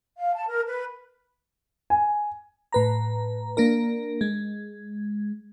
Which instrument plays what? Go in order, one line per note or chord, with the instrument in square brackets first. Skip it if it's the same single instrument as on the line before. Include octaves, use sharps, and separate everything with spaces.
[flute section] F5
A5
A#4
B4
[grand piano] G#5
[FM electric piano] A2 B4 A#5
A#3 D4 A#4
G#3